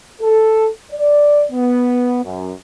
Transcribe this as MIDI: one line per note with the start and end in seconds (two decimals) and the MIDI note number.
0.20 0.68 69
0.92 1.44 74
1.51 2.20 59
2.24 2.52 42